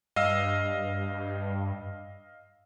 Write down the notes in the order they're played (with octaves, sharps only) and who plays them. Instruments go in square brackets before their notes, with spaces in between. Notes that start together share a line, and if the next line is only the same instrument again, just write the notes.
[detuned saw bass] G2 [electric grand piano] D#5 F5 E6